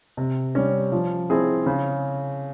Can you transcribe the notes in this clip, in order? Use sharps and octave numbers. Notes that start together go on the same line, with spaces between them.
C3
G3 C#4
F3
C4 E4 G#4
C#3